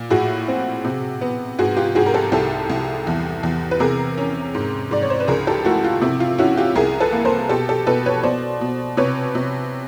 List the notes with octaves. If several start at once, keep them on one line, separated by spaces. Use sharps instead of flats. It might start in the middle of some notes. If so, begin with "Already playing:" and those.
Already playing: A#2
A2 F#4 G#4
C4
C3
B3
G#2 F#4 G#4
F4 G4
G#2 F#4 G#4
A#4
G4 A4
C2 G4 A4
C2
E2
E2
B4
C3 G#4 A#4
C#4
G#2
G#2 D5
C#5
C5
B4
C#2 G#4 A#4
G4 A4
A3 E4 F#4
F4
C3 E4
F4
C#4 E4 F#4
F4 G4
C2 G#4 A#4
A4 B4
A#3
A#4 C5
B2 G4 A4
G4 A4
B2 A4 B4
B4 C#5
B2 C5 D5
B2
C3 B4 C#5
C3